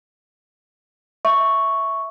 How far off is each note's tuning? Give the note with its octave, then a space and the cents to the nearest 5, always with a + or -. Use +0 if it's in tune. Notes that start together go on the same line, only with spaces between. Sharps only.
E5 -5 C#6 +0